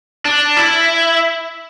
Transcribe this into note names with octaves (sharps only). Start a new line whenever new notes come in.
D4
E4